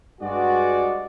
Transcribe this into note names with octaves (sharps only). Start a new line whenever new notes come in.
G2 G#3 F#4 D5